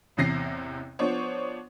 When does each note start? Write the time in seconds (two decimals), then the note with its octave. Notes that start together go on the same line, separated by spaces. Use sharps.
0.17 A1 E2 C3 A#6 C7
0.99 F3 B3 D4 C5 C#5